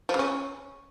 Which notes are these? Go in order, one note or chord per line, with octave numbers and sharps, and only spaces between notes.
F3
C#3
C#4